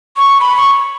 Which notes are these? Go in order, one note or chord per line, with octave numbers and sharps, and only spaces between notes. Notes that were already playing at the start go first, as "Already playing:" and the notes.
C#6
B5
C#6